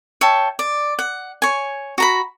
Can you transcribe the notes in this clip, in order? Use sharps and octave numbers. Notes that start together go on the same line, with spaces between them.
C#5 E5 G5 A5
D5
F#5
C#5 G#5
F#4 A#5 B5